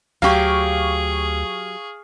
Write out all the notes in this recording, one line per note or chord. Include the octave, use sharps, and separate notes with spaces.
D2 F#3 G4 G#4 F5 C#6